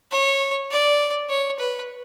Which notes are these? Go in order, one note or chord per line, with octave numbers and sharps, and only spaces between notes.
C#5
D5
C#5
B4